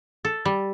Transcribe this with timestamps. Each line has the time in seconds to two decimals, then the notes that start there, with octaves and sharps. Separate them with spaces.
0.25 A4
0.45 G3